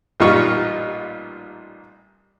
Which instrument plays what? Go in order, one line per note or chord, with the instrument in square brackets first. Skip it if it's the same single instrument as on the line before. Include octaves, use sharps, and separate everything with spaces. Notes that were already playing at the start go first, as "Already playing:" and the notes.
[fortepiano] A1 A#2 G3 D#4 F4 C#6